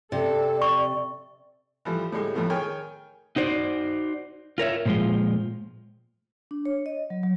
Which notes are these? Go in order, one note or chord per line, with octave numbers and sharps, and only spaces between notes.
C3 A4 D5
C#6
E3 F3 G3 A3
A2 D3 G3 G#3
F2 A2 F3 A3 B3
D#3 G#4 C#5 G5 G#5 F6
D#4 F#4 C5 D5
F4 A#4 C#5 E5
A#2 F3 G3 G#3 F4
D4
C#5
D#5
F#3
F#3